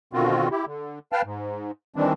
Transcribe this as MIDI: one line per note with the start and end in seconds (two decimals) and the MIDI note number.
0.13 0.49 47
0.13 0.49 50
0.13 0.49 51
0.13 0.49 60
0.13 0.49 65
0.13 0.49 66
0.51 0.65 64
0.51 0.65 67
0.65 0.99 50
1.12 1.22 71
1.12 1.22 77
1.12 1.22 79
1.12 1.22 81
1.12 1.22 89
1.24 1.71 44
1.96 2.13 51
1.96 2.13 52
1.96 2.13 55
1.96 2.13 56
1.96 2.13 60
1.96 2.13 62